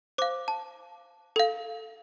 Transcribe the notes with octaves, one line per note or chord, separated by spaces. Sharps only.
C5 F5 D6
A5
A4 F5